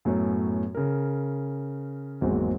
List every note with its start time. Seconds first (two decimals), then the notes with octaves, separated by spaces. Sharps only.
0.05 F#2 A2 F#3 B3 C#4
0.75 C#3 A#4
2.21 G#1 E2 F#3 G#3 A#3 C4